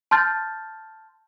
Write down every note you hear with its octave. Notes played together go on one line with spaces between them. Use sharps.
A5 C6 F6 G6 A6